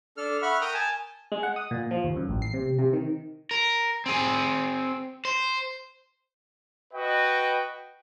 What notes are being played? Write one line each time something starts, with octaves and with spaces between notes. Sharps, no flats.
D4 A4 F6
E5 F#5 B5 C#6 F6
A#4 G5 D#6 F6
G#5 A5
G#3
F#5
D#6
A#2
F3
D#2
F#2
A1
C7
C3
C3
D#3
A#4
C4 G#4
C5
F#4 B4 D#5 G5